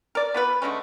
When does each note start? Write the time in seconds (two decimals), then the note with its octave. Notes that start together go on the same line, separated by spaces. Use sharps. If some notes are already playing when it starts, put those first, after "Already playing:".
0.15 A#4 D5
0.34 B3 F4 B4
0.62 D3 G#3 A3 C#4